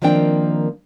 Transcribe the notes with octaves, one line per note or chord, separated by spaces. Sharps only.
D#3 F3 A#3 C4 D4 G5